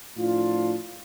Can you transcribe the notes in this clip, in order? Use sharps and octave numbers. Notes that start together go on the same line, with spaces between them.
A2 F3 D4 F4